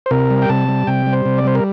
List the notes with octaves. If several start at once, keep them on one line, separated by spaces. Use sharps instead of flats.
C5
C3 A#4
G3
G5
C3 A5
G3
C3 G5
G3
C5
C3
D5
G3 C5
A#4